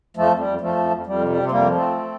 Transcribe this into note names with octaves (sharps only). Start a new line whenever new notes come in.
F2 F3 A3
F2
G3
F2
F2 F3 A3
F2
F2
F2 G3
C3
G3
C3
C4
F2 G3 A#3
F3
A3 C4
F2